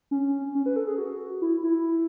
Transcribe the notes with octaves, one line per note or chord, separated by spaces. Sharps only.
C#4
C#4
B4
A4
G#4
F#4
E4
E4